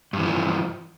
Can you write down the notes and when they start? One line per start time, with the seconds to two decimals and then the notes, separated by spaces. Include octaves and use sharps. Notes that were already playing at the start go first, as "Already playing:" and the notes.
0.13 G2
0.18 E3
0.22 F3